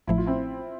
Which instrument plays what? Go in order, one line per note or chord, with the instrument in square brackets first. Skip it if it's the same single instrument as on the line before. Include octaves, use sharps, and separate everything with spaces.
[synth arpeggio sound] A1 A2 F3 A3 [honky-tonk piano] E4
[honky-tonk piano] F4
C4 E4